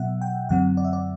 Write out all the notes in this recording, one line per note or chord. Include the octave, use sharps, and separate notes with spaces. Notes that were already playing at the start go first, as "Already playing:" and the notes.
Already playing: B2 F#3 B3 E5 F#5
G5
F#2 D3 F#3 C4 F#5
D5
E5
D5